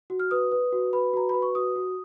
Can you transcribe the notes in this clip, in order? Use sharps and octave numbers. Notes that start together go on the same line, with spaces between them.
F#4
F6
B4 D#6
B4
F#4
B4 B5
F#4 A#5
B4 B5
C#6
F#4 D#6
F#4